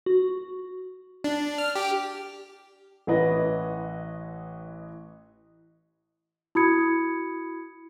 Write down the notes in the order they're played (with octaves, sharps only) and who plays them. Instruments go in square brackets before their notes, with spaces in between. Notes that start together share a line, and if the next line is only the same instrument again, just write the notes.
[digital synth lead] F#4
[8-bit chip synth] D4
F6
G4
[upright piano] A1 E3 B4 D#5
[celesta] E4 F#4 B5 D#6 G#6 C#7